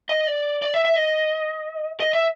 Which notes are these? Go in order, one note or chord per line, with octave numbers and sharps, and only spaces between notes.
D#5
D5
D5
E5
E5
D#5
D#5
E5